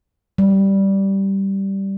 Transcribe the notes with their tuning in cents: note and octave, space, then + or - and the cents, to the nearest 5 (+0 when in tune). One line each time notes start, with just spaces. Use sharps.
G3 -5